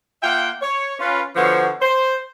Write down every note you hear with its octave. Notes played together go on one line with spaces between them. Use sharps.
A#3 F4 E5 F#5 G5
C#5
C#4 F4 B4
D3 F3 B3 F#4 C5 C#5
C5